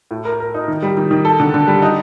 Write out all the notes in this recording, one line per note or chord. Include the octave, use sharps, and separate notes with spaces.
A2
A#4
A#4
D#4
D#3
G3
D#3
D#3
A4
D3
D3
G3
D#4